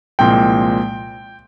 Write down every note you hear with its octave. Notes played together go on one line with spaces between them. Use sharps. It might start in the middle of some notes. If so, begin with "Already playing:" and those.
C2 A#2 F3 G#3 C4 G5